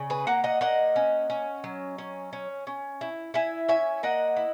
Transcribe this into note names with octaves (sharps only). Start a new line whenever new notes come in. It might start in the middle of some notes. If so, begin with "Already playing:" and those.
Already playing: C#3
G#4 B4
A#3 F#5 A#5
D#5 F#5
A#3 D#5 F#5
C#4
C#4
F#3
C#4
C#4
C#4
E4
E4 E5 G#5
C#4 E5 G#5
A#3 D#5 F#5
E4